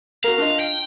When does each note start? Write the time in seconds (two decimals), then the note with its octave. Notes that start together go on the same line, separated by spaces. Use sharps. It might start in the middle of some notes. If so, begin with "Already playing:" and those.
0.24 F#4 A#4 F5
0.38 D4 F4 D#5
0.60 G5